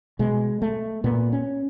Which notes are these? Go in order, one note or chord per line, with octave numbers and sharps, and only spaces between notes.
B2 G#3
A3
A#2 B3
C#4